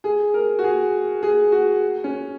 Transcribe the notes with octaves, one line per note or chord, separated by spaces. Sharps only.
G#4
A#4
F#4
G#4
G#4
F#4
C#4